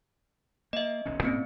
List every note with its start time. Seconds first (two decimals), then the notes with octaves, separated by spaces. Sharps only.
0.73 A#3 D#5 E5
1.06 D#1 B1 C#4
1.23 G#2 B2 A#3 C4 C#4